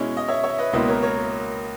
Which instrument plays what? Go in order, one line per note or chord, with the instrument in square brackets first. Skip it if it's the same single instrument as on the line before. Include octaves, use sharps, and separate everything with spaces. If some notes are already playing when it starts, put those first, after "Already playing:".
Already playing: [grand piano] B2 G#3 C#4 E4
[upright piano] D#5
C#5 E5
C#5 E5
B4 D#5
[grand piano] C#2 B2 A#3 E4 [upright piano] B4 D#5
[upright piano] A#4 C#5
A#4 C#5